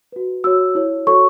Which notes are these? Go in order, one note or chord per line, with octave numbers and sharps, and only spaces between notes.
F#4 B4
F#4 C#5 E6
E4 C#5
F#4 A4 C#5 C#6